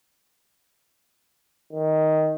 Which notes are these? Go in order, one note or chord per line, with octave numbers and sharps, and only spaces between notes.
D#3